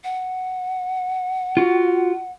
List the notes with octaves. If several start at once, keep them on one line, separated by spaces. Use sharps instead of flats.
F#5
F4 F#4